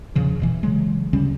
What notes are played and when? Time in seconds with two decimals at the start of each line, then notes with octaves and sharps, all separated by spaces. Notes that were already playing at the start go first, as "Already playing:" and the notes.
0.15 E2 A#2 C#3 F3
0.40 E1 B2 E3
0.63 C#3 E3 F#3 G#3
1.13 D2 C#3 G3 C#4